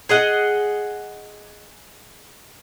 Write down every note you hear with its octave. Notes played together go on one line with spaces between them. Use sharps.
G#4 D#5 F#5